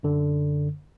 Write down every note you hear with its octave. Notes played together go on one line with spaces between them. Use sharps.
F#2 D3